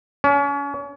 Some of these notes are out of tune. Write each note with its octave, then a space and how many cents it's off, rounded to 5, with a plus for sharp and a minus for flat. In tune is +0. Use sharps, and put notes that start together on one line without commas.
C#4 +35